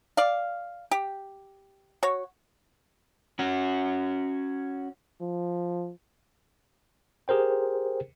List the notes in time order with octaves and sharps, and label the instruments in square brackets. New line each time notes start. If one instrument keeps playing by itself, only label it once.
[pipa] D5 F5
G4
F#4 C#5
[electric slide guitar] C#4 F#4
[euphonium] F3
[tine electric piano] G4 G#4 A#4 C5 G5